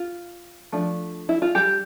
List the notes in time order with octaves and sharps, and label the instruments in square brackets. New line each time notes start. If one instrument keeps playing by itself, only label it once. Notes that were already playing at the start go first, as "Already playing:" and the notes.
Already playing: [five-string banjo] F4
F3 A3 D4
E4
F4
G3 G4